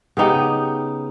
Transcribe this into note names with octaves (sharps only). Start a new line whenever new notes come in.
C#3 B3 D#4 G4